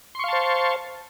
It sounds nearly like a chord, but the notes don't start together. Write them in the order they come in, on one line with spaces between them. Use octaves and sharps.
C6 C#6 F5 A5 C5